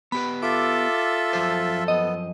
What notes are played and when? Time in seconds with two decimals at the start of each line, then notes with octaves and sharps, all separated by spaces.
0.12 B3 G4 B4 B5
0.43 F4 A4 E5 D6
1.33 F#2 F3 C5
1.88 B3 D#5